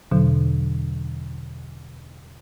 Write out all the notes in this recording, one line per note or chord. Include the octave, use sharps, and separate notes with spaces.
E2 B2 D3 F#3